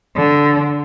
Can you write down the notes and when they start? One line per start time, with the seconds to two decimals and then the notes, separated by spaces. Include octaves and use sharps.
0.16 D3